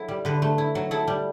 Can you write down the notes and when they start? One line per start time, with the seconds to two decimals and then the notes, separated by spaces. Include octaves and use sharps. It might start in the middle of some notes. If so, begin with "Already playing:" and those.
Already playing: F#3 E4 A4
0.08 G3
0.25 D3 B4
0.42 A3
0.58 E4
0.75 F#3
0.91 E4 A4
1.07 G3